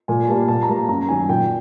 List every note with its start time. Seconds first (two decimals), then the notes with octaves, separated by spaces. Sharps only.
0.08 A#2 G#5
0.23 G#5
0.28 G3 A#3 A5
0.48 A#2 A5
0.63 A#5
0.68 G3 A#3 A5
0.89 F#2 A#5
1.09 D#3 F#3 G#5
1.29 A#2 G5